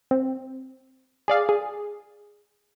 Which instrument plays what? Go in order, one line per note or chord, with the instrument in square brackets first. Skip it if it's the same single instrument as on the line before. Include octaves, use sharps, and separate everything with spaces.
[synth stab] C4
G#4 D5 F5
G#4